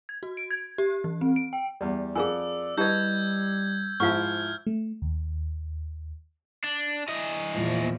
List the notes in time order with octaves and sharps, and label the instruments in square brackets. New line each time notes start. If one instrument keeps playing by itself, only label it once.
[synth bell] G#6
F#4
D7
G#6
G4
E3
C4
D7
G5
[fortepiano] E2 G3
[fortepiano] F2 [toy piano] G#4 A#4 G#5 [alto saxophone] D5 [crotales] E6
[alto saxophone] G3 [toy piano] E4 G4 [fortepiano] B4 D#5 A5 [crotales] G6 G#6
[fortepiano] G#2 F3 E4 [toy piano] F5 C#6 [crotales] F6
[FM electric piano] A3
D#2
[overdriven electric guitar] D4
E3 D#5
[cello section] E2 A#2 F3